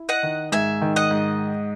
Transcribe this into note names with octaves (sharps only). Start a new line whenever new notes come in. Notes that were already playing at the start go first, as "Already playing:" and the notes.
Already playing: E4
D#5 F#5
D#3
G#2 E5 G#5
D#3
D#5 F#5
G#2